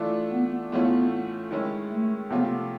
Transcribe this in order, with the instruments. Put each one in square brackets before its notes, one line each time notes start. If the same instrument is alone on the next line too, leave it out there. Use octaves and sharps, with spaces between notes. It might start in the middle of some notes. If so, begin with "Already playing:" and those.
Already playing: [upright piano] E3 A3 D4 F4
[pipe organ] B3
[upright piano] A2 E3 A3 C#4 F4 [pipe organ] B3
[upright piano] D#3 G#3 C#4 E4
[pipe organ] A3
[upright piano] C3 F3 A3 C#4 F4 [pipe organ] B3